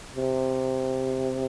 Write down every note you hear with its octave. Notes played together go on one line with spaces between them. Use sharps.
C3